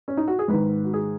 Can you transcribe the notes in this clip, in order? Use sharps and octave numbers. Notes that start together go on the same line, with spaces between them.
C#4
D#4
F#4
G#4
G#2 D#3 B4
F#4
G#4